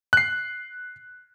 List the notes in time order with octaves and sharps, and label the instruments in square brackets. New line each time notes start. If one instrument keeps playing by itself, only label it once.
[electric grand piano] F#6 C7